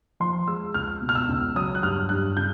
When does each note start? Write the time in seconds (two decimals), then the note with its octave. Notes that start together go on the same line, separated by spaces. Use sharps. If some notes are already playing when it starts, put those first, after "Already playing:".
0.20 F3 C6
0.47 G#3 E6
0.74 C#2 F6
1.01 B2
1.09 F6
1.15 E6
1.29 C#2
1.56 F#3 D#6
1.75 F#6
1.83 G2 F6
2.09 G2 F#6
2.37 C#3 G6